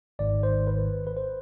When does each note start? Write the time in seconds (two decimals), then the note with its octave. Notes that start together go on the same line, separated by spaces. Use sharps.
0.19 G#1 G#2 D#3 D5
0.43 C5
0.67 B4
1.07 B4
1.17 C5